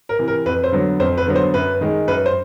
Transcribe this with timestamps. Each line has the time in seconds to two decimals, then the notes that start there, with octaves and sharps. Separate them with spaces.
0.09 A#4
0.19 C3 E3
0.28 A#4
0.46 F2 B4
0.64 C5
0.72 D3 F#3 B3
1.00 F2 C5
1.18 B4
1.27 D3 F#3 B3
1.36 C5
1.54 F#2 B4
1.81 D#3 G#3
2.08 F#2 B4
2.26 C5